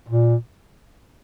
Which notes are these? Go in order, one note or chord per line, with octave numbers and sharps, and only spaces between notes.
A#2